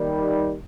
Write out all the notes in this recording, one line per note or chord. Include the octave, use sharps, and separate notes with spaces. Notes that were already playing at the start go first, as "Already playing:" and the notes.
Already playing: D#2 D#3 G3